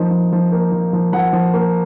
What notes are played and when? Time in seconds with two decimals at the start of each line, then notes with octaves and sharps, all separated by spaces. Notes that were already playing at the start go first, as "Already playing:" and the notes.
Already playing: F3 A#3 D#4
0.11 F3
0.32 F3
0.52 A#3
0.72 F3
0.93 F3
1.13 F3 F#5
1.33 F3
1.54 A#3